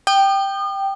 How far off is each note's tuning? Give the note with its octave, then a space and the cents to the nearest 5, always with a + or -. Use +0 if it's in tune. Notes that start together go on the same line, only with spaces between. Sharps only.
G5 +0 D#6 -40